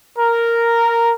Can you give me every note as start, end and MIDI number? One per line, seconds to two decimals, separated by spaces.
0.18 1.12 70